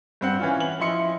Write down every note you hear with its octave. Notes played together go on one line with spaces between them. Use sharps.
G2 C4 F#5
E3 C#4 F4
F#7
F3 E4 D#5 C6 C#7